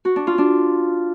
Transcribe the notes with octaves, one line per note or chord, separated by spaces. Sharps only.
F#4
D4
F4
D4